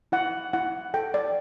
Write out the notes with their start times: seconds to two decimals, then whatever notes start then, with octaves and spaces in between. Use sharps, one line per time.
0.12 E4 F#5
0.53 E4 F#5
0.94 A4 G5
1.14 D5